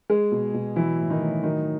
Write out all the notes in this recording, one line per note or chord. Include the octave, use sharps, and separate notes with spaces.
G#3 G#4
B2
B2
E3 F#3 E4
A2
D#3 D#4
A2
D#3 F#3 D#4